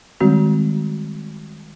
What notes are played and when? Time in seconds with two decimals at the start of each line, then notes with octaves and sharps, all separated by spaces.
0.20 D#3 G3 G#3 C4 F#4